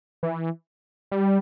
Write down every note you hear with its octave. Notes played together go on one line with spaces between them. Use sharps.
E3
G3